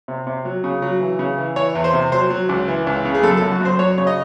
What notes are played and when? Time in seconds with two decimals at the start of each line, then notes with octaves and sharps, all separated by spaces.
0.08 C3
0.27 C3
0.45 F#3
0.64 C#3
0.82 F#3
1.00 E3
1.19 C#3
1.38 E3
1.56 E3 C#5
1.75 E2
1.84 C5
1.93 C3
2.12 F#3 C5
2.30 F#3
2.49 C#2
2.68 E3
2.87 C#2
3.05 C#3
3.15 G#4
3.23 F#2 A4
3.37 F#2 A4
3.51 F#4
3.61 F#2 C5
3.79 F#3 C#5
3.98 C#3 C#5
4.07 D#5